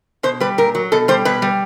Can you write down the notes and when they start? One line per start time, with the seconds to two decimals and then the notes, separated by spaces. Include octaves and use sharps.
0.23 B2 C5
0.40 G3 B4
0.58 A#2 A#4
0.75 F#3
0.92 B2 A4
1.08 G3 C5
1.25 B2 B4
1.42 G3